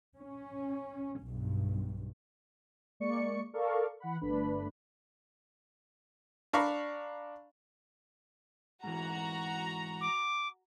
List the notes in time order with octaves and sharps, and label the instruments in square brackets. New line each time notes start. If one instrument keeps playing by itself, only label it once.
[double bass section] C#4
B1 G2
[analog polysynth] G#3 A#3 D5 C#6 C#7
A4 A#4 D5 F5 C#6
E3 F#5 B5
G1 A3 D4 B4 B5
[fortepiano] D4 F5 A#5 B5 C#6
[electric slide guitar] G#2 E3 [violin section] F#4 A#5
[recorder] D6